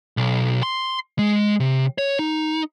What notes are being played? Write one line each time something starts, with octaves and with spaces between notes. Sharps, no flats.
B1
C6
G#3
C3
C#5
D#4